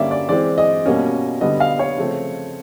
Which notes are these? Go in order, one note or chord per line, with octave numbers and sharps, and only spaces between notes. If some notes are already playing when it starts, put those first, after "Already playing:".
Already playing: D3 G3 A#3 C#4 D5 E5
D5
E3 G#3 C4 D5
D#5
B2 G3 A#3 C#4
D3 G3 B3 D#5
F5
C#5
C#3 F3 A3 C4